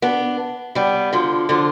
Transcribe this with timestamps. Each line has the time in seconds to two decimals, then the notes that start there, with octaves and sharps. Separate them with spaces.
0.02 B3 D4
0.75 G3 B3
1.13 D3 F3
1.49 D3 F3